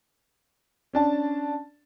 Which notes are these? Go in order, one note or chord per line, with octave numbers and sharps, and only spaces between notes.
C#4 D4 A5